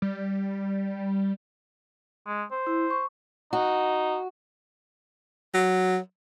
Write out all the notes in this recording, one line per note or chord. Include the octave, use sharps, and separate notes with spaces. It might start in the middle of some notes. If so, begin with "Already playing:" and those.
G3
G#3
C5
E4
C#6
D#4 F#4
F#3